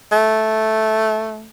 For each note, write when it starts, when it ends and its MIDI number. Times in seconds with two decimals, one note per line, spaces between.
0.12 1.49 57